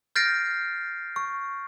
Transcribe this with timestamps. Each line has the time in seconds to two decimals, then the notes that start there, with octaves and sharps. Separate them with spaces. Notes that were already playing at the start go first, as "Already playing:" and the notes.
0.16 F6 G6 A6 A#6 C7 D7
1.16 C#6